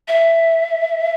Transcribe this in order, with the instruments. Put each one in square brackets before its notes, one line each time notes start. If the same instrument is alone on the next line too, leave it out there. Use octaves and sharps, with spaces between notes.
[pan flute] E5